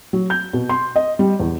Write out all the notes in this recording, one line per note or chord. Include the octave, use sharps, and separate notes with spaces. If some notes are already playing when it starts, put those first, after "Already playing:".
F#3
G6
B2
C6
D#5
G3
E2